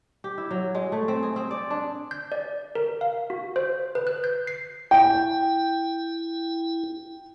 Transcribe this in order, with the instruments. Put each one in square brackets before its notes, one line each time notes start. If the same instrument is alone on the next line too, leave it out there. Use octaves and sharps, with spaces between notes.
[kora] G4
E4
F#3
G#3
A3
C4
G#4
C4
D5
D4
[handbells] G6
D5
A#4
F5
F#4
C5
B4
F#6
G6
C7
[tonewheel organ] E4 [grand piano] G5